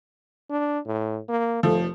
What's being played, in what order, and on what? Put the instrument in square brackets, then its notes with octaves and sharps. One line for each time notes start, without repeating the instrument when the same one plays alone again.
[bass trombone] D4
A2
A#3
[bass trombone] F1 [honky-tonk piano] F3 A3